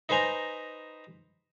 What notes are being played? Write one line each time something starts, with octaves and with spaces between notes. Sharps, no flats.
D#4 B4 C5 G#5 A#5